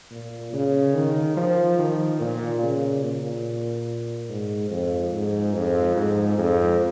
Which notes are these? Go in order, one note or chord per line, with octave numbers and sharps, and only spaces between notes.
A#2
C#3
D#3
F3
D#3
A#2
C#3
A#2
G#2
F2
G#2
F2
G#2
F2